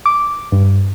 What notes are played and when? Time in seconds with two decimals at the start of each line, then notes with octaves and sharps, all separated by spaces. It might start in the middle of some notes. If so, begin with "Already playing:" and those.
0.06 D6
0.52 G2